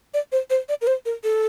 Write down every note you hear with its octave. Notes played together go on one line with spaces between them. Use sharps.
D5
C5
C5
D5
A#4
C5
A#4
A4